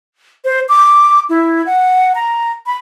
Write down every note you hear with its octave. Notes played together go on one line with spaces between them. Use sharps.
C5
D6
E4
F#5
A#5
B5